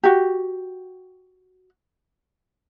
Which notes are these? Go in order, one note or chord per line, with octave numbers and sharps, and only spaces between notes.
F#4 G4